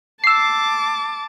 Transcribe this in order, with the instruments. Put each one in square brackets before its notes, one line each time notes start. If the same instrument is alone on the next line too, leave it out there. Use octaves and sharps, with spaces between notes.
[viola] A5 D6 [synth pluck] E6 C7